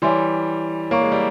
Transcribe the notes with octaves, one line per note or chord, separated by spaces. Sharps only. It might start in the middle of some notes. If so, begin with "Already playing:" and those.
E3 G3 C#5 E5 G#5 C6
A#3 C#5 F5 A#5 C#6
G#3
G3